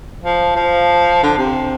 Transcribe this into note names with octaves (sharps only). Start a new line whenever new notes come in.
F3
F3
D3
C3